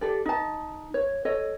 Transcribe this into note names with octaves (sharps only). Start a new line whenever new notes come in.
G4 A4 D5
D#4 A5
C#5
A4 C#5 D#5